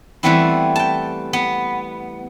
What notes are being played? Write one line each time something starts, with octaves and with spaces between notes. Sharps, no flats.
E3 G3 A3 B3 C4 E4
G5 A5
B3